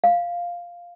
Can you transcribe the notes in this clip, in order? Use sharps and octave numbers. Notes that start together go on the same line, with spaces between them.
F5